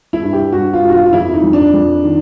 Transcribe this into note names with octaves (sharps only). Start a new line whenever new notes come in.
E4
G2
G4
G2 F#4
F4
G2
F#4
F4
F4
F2 E4
D#4
F2
D4
F2
D#3